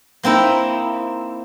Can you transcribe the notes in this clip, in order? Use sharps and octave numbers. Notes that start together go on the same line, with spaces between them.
A#3 C4 D#4 E4